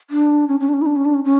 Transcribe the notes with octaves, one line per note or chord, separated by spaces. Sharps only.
D4
C#4
C#4
D4
C#4
E4
D4
C#4
D4
C#4
C#4